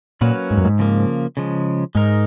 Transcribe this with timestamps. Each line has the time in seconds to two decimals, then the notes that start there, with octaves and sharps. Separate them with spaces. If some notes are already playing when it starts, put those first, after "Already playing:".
0.21 A#2 F#3 A#3 C#4 F#4 B4
0.51 G#2
0.58 F#2
0.65 G#2
0.79 C#3 F3 A#3
1.37 C#3 F3 G#3
1.95 G#2 G#3 D#4 A#4